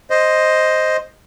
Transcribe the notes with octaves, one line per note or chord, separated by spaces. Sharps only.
C5 D#5